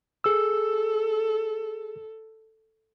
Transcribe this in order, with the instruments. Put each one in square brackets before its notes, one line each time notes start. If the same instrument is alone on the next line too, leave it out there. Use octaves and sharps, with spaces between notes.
[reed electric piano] G#4 E6 [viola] A4